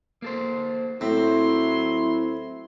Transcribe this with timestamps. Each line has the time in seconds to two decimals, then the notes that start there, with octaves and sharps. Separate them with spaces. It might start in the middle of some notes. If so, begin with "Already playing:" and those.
0.22 A#3 A4 C5
1.01 A2 F#3 C4 E4 C6